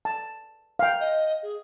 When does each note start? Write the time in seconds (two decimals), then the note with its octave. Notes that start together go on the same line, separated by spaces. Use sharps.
0.05 A5
0.79 F5 G5
1.00 D#5
1.43 G#4